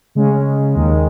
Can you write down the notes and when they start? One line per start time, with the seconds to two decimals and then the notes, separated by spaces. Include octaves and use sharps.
0.15 C#3 G#3 C#4
0.74 D#2 D#3 G#3